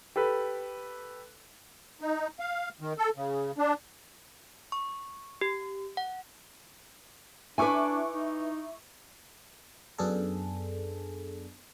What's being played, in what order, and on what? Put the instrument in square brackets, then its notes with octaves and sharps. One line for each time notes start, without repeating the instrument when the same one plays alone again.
[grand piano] G4 A4 B4
[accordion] D#4
F5
D#3
A4
C#3
D4
[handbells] C#6
G4
F#5
[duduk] D4 [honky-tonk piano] E4 C#6 D6 [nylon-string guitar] B4 G#5
[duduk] D#4
[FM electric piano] F#2 B3 D4 G#4 A4